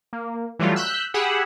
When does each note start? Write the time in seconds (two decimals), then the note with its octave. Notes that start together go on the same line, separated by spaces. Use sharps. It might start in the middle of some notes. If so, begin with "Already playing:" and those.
0.13 A#3
0.59 E3 F#3 G3 A3 F4
0.76 E6 F#6 G6 B6
1.14 G4 G#4 F#5 B5 E6